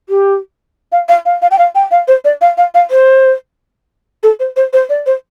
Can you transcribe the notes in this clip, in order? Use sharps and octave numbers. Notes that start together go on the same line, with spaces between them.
G4
F5
F5
F5
F5
G5
F5
G5
F5
C5
D5
F5
F5
F5
C5
A4
C5
C5
C5
D5
C5